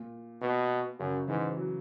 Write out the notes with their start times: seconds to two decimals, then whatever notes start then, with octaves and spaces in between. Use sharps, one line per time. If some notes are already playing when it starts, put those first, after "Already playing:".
Already playing: A#2
0.41 B2
0.99 F#2 C#3
1.27 G#2 E3
1.57 F#3